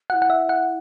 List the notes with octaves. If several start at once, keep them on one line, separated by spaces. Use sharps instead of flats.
F#4 F#5
E4
F#5
E5
F#5